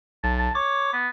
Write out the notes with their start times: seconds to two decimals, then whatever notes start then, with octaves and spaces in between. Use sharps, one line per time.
0.24 B1 A5
0.39 A5
0.55 C#5 D6
0.93 B3